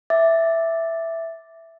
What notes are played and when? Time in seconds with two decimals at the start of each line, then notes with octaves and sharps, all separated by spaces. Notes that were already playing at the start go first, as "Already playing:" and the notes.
0.10 E5 D6 A6